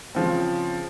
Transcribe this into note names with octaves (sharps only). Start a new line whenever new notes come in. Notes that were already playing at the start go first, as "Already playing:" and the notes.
C#3 F3 C4